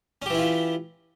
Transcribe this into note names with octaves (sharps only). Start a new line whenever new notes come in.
E3 C#4 E4 F4 G4